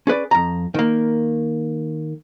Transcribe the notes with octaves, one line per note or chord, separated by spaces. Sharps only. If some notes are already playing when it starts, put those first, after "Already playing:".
C#4 G#4 B4 D5
F2 A#5
D#3 A#3